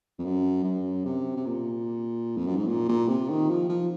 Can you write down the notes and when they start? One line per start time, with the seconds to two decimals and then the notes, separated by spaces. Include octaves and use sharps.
0.19 F2
0.25 F#2
0.64 F#2
1.05 C3
1.37 C3
1.46 A#2
2.37 F2
2.47 F#2
2.57 G#2
2.68 A#2
2.88 A#2
3.08 C3
3.30 D#3
3.49 F3
3.69 F3